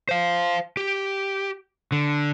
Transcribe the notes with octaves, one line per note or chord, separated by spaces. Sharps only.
C5 F5
G4
D3